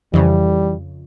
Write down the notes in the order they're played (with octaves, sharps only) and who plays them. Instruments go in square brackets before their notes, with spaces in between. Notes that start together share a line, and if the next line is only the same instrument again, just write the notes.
[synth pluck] F2 C#3 [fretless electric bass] E3 [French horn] G3